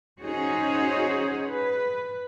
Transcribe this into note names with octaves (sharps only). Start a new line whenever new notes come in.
C#4 D#4 F#4 G#4 C5 C#5
B4